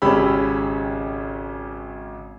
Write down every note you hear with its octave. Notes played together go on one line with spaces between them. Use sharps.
G#1 C#3 C#4 G4 B5 E6